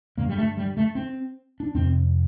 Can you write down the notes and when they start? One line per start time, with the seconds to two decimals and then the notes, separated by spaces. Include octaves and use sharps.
0.18 G2 D3 A#3
0.29 G3
0.38 A3
0.57 G3
0.77 A3
0.95 C4
1.60 D4
1.75 F2 C3 C4